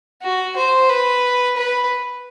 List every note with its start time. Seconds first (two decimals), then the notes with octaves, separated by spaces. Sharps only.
0.22 F#4
0.57 C5
0.89 B4
1.57 B4